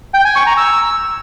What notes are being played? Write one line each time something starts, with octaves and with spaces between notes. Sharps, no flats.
G5
G#5
C#6
A#5
E6